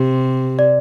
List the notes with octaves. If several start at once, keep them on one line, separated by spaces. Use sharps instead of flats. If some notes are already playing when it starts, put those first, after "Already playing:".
Already playing: C3 G4
D5